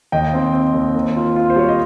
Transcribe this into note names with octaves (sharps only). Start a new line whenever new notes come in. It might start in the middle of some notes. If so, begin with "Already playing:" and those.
D#2 D#5 G5
C4
C4
D#2
A#3
F4
F4
C5
G3 C#5
D#5